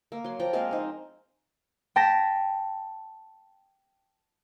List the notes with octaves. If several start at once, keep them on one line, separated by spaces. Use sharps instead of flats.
A#3
F#3 C6
F3 G5 A#5
G#3 A#3 C4 F5
D#4 C5
G5 A5 A#6 B6